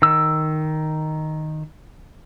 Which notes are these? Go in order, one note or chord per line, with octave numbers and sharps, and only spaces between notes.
D#3 E6